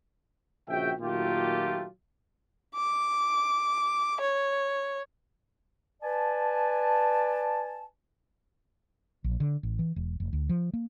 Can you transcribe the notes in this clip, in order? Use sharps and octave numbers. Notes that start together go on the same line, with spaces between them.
A#1 C#3 F#4 E5 G5
A#2 D#3 F#3 A3 F4 G4
D6
C#5
B4 D5 G#5 A5
A#1
D3
A1
E3
E1
F1
D2
F3
A#3